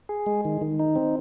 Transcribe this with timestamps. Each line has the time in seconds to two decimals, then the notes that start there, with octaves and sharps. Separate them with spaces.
0.09 G#4
0.26 G#3
0.45 D#3
0.61 D#3
0.79 D#4
0.96 C4